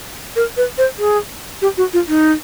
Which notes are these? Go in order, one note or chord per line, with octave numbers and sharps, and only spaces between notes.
A#4
B4
C5
G#4
G4
F#4
F4
D#4